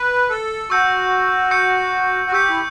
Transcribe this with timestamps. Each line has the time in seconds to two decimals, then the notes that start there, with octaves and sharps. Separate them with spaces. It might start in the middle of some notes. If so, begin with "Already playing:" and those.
Already playing: B4
0.29 A4
0.70 F#4 C#6 E6 G6 C#7
1.51 C#6 E6 G6 C#7
2.26 F#4
2.32 G4 C#6 E6 G6 C#7
2.50 E4